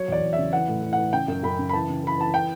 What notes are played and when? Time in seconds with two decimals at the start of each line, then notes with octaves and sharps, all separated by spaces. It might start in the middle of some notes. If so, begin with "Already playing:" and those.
Already playing: F#3 C#5
0.08 E2 D5
0.22 E2
0.33 E5
0.38 C#3
0.53 E3 F#5
0.68 A2
0.82 E3
0.93 F#5
0.98 E3
1.13 C#3 G5
1.28 F#2
1.43 F#2 B5
1.59 C#3
1.69 B5
1.73 E3 A5
1.89 C#3
2.04 E3 B5
2.18 E3 A5
2.34 G5